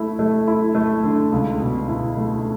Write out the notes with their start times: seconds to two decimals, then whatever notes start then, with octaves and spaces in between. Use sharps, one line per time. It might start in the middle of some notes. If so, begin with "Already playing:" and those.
Already playing: A3 E4
0.19 A3
0.48 E4
0.75 A3
1.04 D3
1.32 C#2
1.60 B2
1.88 E4
2.17 A3